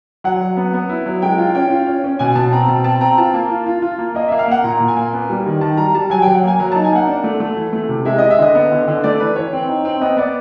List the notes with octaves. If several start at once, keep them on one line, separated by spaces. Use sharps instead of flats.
F#3 F#5
F#3
B3
B3
E4
F#3
G#3 G5
F4 G5
C#4 G5
F4
C#4
C#4
B2 G#5
B2 A5
C4 A#5
B2 A5
C4 A5
C4 A#5
F4 A5
A#3
F4
F4
F4
A#3
A#3 D#5
A#3 E5
F5
A#3 F#5
A#2 A#5
A#2
G#5
A#3
B3
G3
D#3
D#3 A5
G3 A#5
G3 A5
F#3 G#5
G5
F#3
F#5
A#3 G#5
F#3 A#5
D#4 A5
G#5
A#3 F#5
D4
A3
A3
E3
A3
C3
G#3 E5
G#3 D#5
E5
D3 D#5
B3
D3
D3
A3 D5
E3 B4
E3 C#5
C4
D#4
C4
B3 D#5
B3 D5